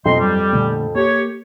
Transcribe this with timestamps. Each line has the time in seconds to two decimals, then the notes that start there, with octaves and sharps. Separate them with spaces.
0.05 F2 B2 F#3 D4 D#5 C6
0.20 G2 F#3 G3
0.53 A#2 D3 A3
0.95 A#3 G4 C#5